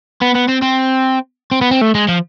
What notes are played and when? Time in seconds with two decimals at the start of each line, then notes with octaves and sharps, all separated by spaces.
0.22 B3
0.35 B3
0.49 C4
0.62 C4
1.51 C4
1.61 B3
1.71 C4
1.81 A3
1.95 G#3
2.08 F3